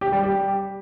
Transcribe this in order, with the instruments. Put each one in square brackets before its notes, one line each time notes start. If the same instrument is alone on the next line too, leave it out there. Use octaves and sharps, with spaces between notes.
[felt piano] G4
G3
G4